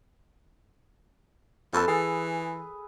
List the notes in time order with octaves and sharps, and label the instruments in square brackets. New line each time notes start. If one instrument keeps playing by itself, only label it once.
[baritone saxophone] F2 [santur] A4 B4 E6
[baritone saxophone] E3 [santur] G#4